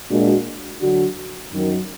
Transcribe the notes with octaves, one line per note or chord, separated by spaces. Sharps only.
A#2 G#3 D4 F#4
D3 F#3 D4 F#4
F#2 D#3 F#3